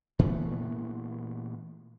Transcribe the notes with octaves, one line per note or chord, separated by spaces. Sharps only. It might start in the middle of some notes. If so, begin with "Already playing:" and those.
A#2 E3 A3 B3